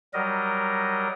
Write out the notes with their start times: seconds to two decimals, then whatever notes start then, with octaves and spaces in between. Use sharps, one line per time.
0.14 F#3 G3 A#4 D#5